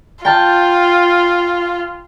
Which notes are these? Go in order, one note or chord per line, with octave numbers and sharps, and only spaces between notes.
F4 G5 A5 F6